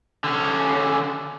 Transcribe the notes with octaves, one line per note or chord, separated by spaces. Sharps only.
D3 C#4